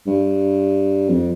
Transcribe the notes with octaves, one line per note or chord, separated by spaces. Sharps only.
G2
F2